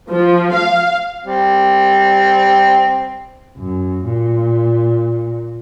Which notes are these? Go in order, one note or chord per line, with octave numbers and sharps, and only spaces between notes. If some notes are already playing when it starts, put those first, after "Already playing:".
F3
F5
G3 C4
F#2
A#2